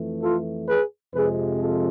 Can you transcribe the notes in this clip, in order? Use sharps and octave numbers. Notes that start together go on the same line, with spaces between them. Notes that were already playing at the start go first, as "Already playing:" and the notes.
Already playing: F2 E3 A3
F4 A4
G#4 B4
F2 C3 F3 G#3 G#4 B4
F4 A4